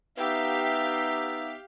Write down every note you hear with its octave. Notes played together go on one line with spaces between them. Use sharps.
B3 D#4 G4 E5 F5